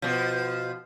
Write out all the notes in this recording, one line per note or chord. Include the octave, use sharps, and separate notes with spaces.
B2 F3